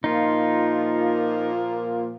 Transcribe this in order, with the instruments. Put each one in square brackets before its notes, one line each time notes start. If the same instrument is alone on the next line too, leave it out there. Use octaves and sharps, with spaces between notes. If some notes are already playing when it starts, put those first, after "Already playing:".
[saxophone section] A#2 F3 A#3 [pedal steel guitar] D#4 F4